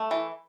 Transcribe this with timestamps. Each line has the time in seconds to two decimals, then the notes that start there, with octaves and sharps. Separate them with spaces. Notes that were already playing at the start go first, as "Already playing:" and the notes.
Already playing: A3
0.11 E3